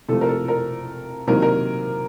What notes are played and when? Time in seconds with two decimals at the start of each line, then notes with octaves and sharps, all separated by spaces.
0.08 C3 F3 A3 A4
0.21 A#4
0.29 A4
0.48 A#4
1.27 C3 D#3 F#3 A#3 A#4
1.42 A#4